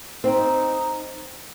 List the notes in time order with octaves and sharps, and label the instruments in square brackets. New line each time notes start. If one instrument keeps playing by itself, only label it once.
[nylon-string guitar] C4 [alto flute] D#4